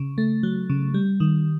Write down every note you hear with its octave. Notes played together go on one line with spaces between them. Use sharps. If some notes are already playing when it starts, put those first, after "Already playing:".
Already playing: C#3
A3
F#3
C#3
G3
D#3